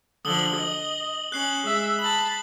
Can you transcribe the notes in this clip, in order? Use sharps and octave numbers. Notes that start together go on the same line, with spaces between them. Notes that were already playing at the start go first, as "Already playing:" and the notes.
D3 F3 D#6 F#7 G7
D#5
C#4 F#6 C7 F#7
G#3 E5
A5 B5 F#7